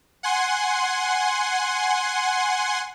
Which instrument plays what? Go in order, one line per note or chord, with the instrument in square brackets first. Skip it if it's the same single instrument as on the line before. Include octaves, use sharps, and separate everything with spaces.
[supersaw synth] F#5 G#5 C6